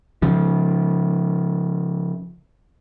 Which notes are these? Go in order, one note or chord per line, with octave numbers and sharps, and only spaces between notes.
C#3 F3